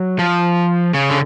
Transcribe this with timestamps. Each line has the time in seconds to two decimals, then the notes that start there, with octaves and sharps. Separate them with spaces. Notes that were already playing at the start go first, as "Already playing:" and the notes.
Already playing: F#3
0.19 F3
0.94 C#3
1.10 D3